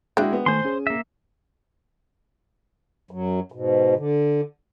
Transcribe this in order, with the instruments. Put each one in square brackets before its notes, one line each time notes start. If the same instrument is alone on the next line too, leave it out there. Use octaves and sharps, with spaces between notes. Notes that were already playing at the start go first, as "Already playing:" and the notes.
[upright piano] G#3 E4 F#4 [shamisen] D4 G5
[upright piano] B3
[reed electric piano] D#3 A3 [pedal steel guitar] C5 C6 [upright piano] G#5
[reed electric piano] C#4 G#4
[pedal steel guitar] A#3 E5
[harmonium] F#2 F#3
G#2 B2
D3